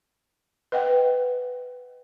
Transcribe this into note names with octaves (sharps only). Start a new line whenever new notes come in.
B4 D#5 F#5 G5